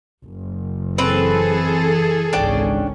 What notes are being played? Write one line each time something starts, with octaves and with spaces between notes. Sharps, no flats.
F#1
E3 C4 G#4 A4 B4
G#1 C#2 C#4 D4 D5 G5